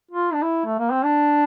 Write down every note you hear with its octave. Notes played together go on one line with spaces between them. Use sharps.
F4
D4
E4
A3
A#3
C4
D4